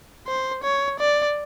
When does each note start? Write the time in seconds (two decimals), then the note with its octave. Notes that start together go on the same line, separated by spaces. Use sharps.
0.27 C5
0.64 C#5
1.00 D5